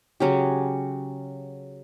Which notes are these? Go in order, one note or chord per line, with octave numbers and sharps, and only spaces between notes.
C#3 F#3 C#4 G4